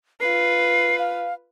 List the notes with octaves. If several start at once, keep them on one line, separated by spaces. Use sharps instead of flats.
F4 B4 C7
F5